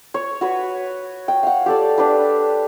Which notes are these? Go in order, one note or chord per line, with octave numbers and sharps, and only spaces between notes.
C#5
F#4 B4 C#5
G5
F5 F#5
G4 A4 D5
D4 G4 B4